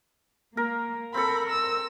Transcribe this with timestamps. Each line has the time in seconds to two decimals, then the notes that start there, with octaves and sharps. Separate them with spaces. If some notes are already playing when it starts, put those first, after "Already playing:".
0.57 A#3 A#4
1.14 C4 A4 A#4 B5
1.50 E6